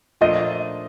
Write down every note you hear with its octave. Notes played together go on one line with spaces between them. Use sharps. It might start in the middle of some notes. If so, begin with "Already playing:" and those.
A#2 F3 A3 D4 F4 D#5